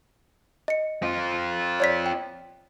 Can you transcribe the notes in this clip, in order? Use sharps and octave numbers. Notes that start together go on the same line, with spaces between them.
D#5 C#7
C4 F4
C#5 D5 B6
G5